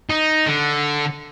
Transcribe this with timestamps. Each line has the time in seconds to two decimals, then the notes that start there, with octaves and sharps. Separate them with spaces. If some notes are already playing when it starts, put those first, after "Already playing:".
0.10 D#4
0.47 D3